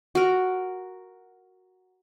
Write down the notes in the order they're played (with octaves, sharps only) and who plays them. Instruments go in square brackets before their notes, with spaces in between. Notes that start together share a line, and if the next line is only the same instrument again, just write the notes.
[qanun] F#4 A#4